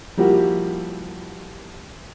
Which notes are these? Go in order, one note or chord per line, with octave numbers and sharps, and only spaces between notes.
F3 G3 A#3 E4 F#4 G4